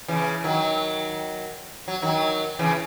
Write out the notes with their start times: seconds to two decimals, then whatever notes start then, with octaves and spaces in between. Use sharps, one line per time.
0.08 C#3 E3
0.44 D#3 F#3
1.88 F#3
2.02 D#3 F#3
2.59 C#3 E3